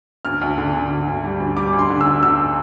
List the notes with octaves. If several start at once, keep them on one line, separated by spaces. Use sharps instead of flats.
D2 F6
D2
D3
D3
D2
D2
G3
D2
G3 D6
D2
C6
D3
E6
D2
D2 E6